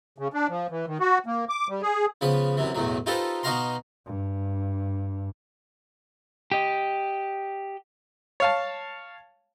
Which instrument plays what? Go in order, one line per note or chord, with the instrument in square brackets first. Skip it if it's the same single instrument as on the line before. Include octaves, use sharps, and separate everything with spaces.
[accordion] C#3
D4
F3
E3
D#3
F#4
A#3
D6
G3
G#4
[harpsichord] C#3 F3 B3 B4
F#2 C3 E3
B1 E2 A2 F#3
D#4 F4 G4 A4 B4 C5
B2 D#4 F#4 F5 A#5 C6
[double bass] G2
[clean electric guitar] G4 D#5
[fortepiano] C#5 F5 A5